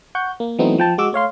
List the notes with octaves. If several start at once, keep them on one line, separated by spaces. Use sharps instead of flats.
F#5 C#6 G6
A#3
E3 F#3 A3 B3 C4 D#4
F3 G5 A5
G#3 F#4 D6 E6
A3 C#5 F5 C6